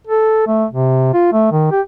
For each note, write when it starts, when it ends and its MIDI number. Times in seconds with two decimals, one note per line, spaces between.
0.07 0.45 69
0.47 0.65 57
0.70 1.13 48
1.14 1.28 65
1.33 1.47 57
1.52 1.67 51
1.71 1.81 67